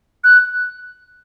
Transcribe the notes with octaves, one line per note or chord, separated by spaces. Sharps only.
F#6